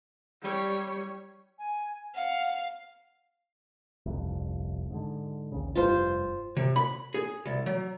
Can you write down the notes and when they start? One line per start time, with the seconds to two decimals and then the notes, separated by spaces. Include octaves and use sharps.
0.42 G3 C#5
1.59 G#5
2.15 F5 F#5
4.06 G1 C2 F2
4.90 G#2 D3
5.52 A#1 D#2 C#3
5.75 F1 G2 G3 F4 C5
6.56 C3
6.76 B5
7.14 G#4
7.45 C2
7.66 F#3